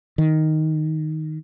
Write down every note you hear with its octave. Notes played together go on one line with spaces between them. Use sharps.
D#3